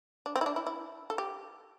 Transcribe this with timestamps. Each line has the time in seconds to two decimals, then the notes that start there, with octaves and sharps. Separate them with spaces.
0.26 D4
0.36 C4
0.41 E4
0.46 D4
0.56 E4
0.67 E4
1.10 A4
1.18 G4